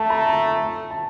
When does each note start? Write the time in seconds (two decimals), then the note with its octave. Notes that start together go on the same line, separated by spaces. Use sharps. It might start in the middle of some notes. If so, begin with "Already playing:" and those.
Already playing: A3 A5
0.10 A#5
0.26 A5
0.90 A5